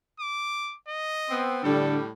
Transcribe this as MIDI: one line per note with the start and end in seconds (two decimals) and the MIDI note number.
0.20 0.77 86
0.88 1.47 75
1.30 1.62 59
1.30 1.62 60
1.64 2.10 45
1.64 1.97 50
1.64 2.10 55
1.64 1.97 62
1.64 1.95 69